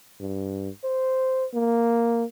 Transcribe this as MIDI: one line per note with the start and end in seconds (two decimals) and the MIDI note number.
0.21 0.69 43
0.84 1.46 72
1.54 2.24 58